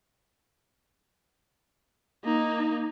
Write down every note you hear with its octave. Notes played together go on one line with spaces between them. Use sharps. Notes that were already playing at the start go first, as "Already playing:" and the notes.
A#3 D#4